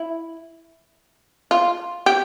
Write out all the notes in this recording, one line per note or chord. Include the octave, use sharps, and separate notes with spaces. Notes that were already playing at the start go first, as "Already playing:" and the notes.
Already playing: E4
F4
G4